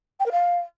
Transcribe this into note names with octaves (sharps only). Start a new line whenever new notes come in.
G5
A#4
F5